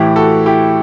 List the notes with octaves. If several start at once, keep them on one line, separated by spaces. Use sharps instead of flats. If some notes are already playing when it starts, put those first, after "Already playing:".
Already playing: A2 E3 E4 G4
F#4 A4
E4 G4